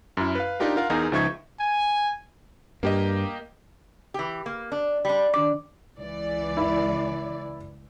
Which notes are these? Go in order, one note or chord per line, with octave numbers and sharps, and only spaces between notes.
F#2 E4
B4 F5
D4 D#4 F4 G4 A#4
F4 A#4 F5 F#5
E2 D#4 G#4 A#4
C#2 F3 D#4 E5 C#6 G#6
G#5
G2 A#3 G4 D#5
E3 G4
A#3
D4
G3 D4
D#3 D4 D5 D6
C#2 E3 D5
E4